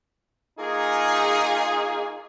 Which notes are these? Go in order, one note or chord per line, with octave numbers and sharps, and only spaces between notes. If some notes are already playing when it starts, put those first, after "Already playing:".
A#3 D#4 F4 G#4